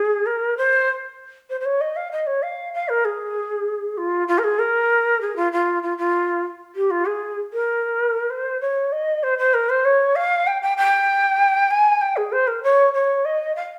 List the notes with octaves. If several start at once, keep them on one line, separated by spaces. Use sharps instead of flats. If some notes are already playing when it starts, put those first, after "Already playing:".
Already playing: G#4
A#4
C5
C5
C5
C#5
D#5
F5
D#5
C#5
F5
F5
A#4
G#4
F4
F4
A#4
G#4
A#4
G#4
F4
F4
F4
F4
G4
F4
G#4
A#4
C5
C#5
D#5
C5
C5
A#4
C5
C#5
F5
G5
G5
G5
G#5
G5
G#4
C5
A#4
C#5
C#5
D#5
F5